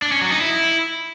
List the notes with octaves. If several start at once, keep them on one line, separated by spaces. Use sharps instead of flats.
D4
C#4
F#3
D#4
E4